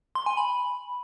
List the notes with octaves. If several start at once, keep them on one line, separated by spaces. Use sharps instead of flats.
C6
G#5
B5